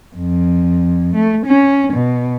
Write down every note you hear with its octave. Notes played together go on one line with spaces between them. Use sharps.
F2
A3
C#4
B2